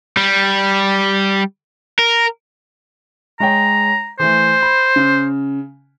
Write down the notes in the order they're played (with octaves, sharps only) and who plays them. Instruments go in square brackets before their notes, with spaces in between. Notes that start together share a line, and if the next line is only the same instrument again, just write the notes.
[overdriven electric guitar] G3
A#4
[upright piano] G#3 C#5 G5 [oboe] A#5
[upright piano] E3 A3 [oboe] C5
[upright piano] B5
C#3